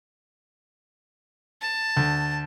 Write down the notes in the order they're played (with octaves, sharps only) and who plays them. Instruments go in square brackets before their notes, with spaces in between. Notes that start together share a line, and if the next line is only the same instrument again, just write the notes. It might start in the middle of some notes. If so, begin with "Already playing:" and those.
[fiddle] A5
[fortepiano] D2